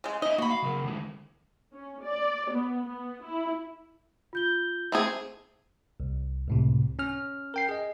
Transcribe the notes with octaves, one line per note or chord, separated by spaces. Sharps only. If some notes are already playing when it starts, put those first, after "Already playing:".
C#3 G#3
D#4 D#5 E5
A#3 F#4 B5
F5
C#3 F#3 A#4
D3 E3 G#3
C#4
D5
B3
B3
E4
F4 G6 G7
A3 C4 G#4
C2
C#2 A2 C3
C#4 F6
A#4 G5 C7
G#4 D#5